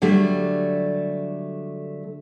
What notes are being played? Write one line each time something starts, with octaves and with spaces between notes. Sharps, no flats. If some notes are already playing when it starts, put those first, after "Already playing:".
D3 F#3 G3 A3